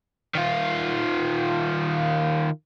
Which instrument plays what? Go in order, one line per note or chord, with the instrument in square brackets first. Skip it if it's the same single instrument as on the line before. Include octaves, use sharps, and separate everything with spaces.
[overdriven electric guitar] D#3 F4